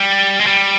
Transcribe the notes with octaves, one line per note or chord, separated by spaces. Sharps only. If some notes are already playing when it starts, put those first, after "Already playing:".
Already playing: G3
G#3
G3